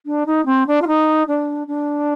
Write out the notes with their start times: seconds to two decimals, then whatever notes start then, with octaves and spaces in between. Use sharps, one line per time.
0.06 D4
0.26 D#4
0.46 C4
0.67 D4
0.82 F4
0.87 D#4
1.28 D4
1.67 D4